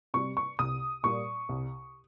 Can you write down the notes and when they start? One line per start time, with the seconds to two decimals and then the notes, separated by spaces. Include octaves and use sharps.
0.14 C3 G3 C#6
0.37 C#6
0.59 C2 D#6
1.03 A#2 G3 A#3 C#6
1.49 C2